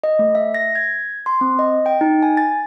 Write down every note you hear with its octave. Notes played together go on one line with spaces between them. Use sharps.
D#5
A3
E5
A#6
G#6
C6
C4
D#5
G5
D#4
G#5
A6